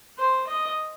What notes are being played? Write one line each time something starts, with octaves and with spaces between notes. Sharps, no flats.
C5
D#5